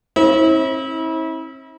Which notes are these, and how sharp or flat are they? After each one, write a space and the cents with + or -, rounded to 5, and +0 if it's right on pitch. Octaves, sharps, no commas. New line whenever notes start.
C4 +45 E4 -35